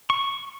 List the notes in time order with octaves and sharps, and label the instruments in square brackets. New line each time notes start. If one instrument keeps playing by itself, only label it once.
[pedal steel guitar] C#6